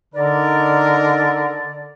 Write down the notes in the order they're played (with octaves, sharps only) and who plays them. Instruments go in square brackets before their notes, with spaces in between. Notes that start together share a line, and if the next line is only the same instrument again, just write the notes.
[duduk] D3 [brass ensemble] D#4 A#4 [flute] D5